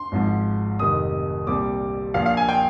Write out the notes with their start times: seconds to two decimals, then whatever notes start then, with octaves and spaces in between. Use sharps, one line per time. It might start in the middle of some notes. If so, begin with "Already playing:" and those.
Already playing: C6
0.12 G#1 G#2 F3
0.79 F1 F2 C3 D#3 G3 D#6
1.47 C2 A#2 G3 C4 D6
2.14 A#1 A#2 F3 A#3 F5
2.26 F5
2.37 G#5
2.49 G5